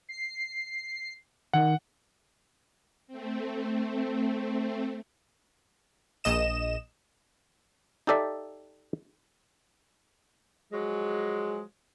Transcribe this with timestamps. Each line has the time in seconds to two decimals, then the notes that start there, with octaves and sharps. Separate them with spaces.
0.09 C7
1.53 D#3 F#5
3.07 A3 C4
6.24 A#1 D#5 E7
8.07 D#4 G4 A4 D5 E5
10.73 F3 F#3 G#3